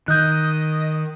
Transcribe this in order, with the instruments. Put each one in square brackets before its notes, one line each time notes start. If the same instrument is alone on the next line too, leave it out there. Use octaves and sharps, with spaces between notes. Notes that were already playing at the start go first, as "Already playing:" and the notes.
[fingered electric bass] D#3 [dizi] D#5 [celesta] F#6 G6